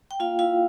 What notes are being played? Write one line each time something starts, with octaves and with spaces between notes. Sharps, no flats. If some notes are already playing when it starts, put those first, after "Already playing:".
G5
A#3 F4 F5
E4 F4 F5